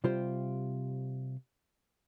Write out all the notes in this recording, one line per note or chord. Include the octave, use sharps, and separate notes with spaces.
C3 G3 F4 G4 C5